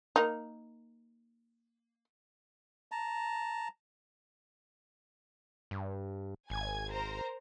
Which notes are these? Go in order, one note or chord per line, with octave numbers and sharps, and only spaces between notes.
A#3 D#4
A5 A#5
G2
G#1 G#5 G#6
A#4 C5 A#5